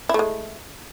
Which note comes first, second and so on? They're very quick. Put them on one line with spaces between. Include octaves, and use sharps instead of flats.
E4 A3 G#3